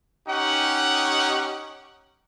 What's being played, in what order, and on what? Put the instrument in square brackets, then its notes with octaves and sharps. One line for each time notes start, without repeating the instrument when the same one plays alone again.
[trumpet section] C#4 D#4 G4 F#5